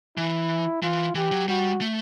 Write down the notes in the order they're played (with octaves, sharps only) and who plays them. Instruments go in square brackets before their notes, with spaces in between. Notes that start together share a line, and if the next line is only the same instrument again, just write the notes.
[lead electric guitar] E3 [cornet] E4
[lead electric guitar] E3 [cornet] F4
[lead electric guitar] E3 [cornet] G4
[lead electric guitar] F#3
[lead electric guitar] G3 [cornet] F#4
[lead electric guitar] A3